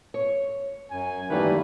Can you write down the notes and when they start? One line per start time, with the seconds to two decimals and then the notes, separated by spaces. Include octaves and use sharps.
0.14 C#5
0.91 F#2 G#5
1.30 D#3 E3 G3 A3 A#3 B4